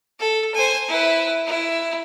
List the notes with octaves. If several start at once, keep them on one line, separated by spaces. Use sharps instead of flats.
A4
C5 G#5
E4 B4
E4